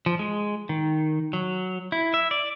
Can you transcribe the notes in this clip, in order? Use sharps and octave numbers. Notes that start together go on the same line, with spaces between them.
F3
G#3
D#3
F#3
E4
E5
D5